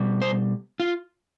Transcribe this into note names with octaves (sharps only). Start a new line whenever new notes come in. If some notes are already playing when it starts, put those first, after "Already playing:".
Already playing: B2 G3
C5
F4